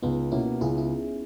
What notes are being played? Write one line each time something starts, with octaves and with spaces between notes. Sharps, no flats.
C#2 B3 D#4
B2 A#3 C#4 E4
C#2 E4 G#4
E4